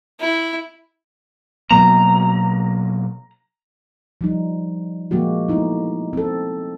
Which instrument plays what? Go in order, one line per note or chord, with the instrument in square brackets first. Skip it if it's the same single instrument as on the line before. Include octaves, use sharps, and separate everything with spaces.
[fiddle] E4
[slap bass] B2 F#3 A#3 [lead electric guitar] A#5
[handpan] F3 G3 D#4
F3 G#3 A#3 F#4 G4
A3 B3 D#4 E4
C4 A4